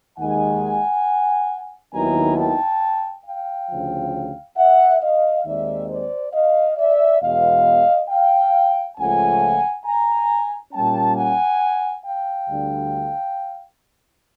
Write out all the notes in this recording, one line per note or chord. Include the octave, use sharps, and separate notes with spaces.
D#2 D#3 G#3 F#5 G#5
D#2 D#3 F#3 B3 E4 G#5 A#5
G5 A5
F5 G5
D2 C#3 F3
E5 F#5
D#5 F5
D#2 D#3 G#3 C4 D5 E5
C5 D5
D#5 F5
D5 E5
E2 B2 G#3 B3 D#5 F5
F5 G5
C#2 C#3 F3 A3 F#5 G#5
G#5 A#5
A#2 G3 A#3 C#4 G5 A5
F#5 G#5
F5 G5
D2 D3 G3